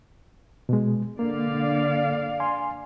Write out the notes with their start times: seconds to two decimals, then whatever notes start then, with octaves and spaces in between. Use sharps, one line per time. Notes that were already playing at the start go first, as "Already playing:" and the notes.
0.69 B2 G#3
1.19 D3 A#3 D5 F5
2.40 G#5 C6